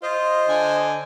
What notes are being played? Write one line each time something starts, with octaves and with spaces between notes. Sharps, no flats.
F4 C5 D#5
D3 G#5